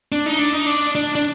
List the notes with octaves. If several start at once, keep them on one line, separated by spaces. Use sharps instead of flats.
D4
D#4
D4
D#4
D4
D4
D4